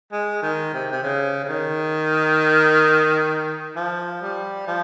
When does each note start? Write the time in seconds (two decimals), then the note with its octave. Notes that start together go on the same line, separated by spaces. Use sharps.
0.12 G#3
0.43 D#3
0.74 C3
0.92 C3
1.03 C#3
1.44 C#3
1.48 D#3
3.76 F3
4.22 G3
4.67 F3